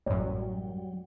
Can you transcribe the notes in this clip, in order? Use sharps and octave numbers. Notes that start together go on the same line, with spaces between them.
A1 F#2 F#3 G3